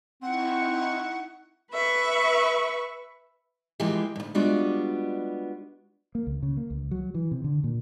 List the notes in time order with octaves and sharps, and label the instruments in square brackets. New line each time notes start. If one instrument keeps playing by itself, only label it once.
[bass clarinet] C4 [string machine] D#4 E4 C#6 [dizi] F#5
[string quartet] B4 E5 C#6
[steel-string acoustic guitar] E3 F3 G#3 A#3 G4
D2 G2
G3 G#3 B3 D4 F4 F#4
[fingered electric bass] A#3
C#2
C#3
A#3
C#2
F#3
E3
C3
D3
A#2